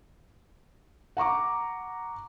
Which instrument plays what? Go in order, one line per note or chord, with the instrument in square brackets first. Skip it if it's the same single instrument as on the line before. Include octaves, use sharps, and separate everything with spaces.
[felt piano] F#5 A#5 C#6 D6